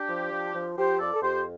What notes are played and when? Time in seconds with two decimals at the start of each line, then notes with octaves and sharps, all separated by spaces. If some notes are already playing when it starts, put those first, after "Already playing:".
Already playing: D4 G4
0.09 F3
0.32 F3
0.54 F3
0.77 F3 G4 C5
0.99 F2 A4 D5
1.14 A4
1.22 F2 G4 C5